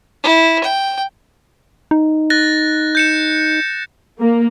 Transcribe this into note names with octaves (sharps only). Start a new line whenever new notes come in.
E4
G5
D#4
F#6 A6 A#6
G6 C#7 E7
A#3